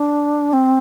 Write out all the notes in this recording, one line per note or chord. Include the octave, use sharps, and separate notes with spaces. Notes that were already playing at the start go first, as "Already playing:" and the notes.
Already playing: D4
C4